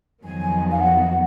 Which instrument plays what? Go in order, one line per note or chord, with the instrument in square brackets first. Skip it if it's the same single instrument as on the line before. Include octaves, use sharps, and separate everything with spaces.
[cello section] F2 D#3 F#3 B3 [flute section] G#5
[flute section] F5
F#5